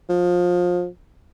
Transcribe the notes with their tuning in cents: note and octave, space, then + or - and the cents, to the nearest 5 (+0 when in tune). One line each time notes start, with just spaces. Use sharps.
F3 +25